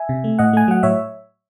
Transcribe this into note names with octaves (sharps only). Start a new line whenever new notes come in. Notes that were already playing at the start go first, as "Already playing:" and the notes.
Already playing: E5 G#5
C3
A3
A2 D#5 F#5
A3 G#5
F#3 F#5
A2 C#5 E5